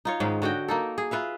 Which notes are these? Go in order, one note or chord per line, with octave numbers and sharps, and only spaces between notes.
D#4 F4 C#5
G#2 D#3 G#3 C#4
D3 F#4 D#5 G5
A#3 D#4 A4
G#4
F4 B4 E5 F5